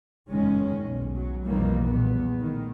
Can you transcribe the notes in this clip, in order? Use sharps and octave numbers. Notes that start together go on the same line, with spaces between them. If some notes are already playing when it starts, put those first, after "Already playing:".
F#1 E2 D#3 G#3 C#4
B1
F#3
B1 F2 D#3 E3 G3 A#3
E2 A#2 B3
A2 D#3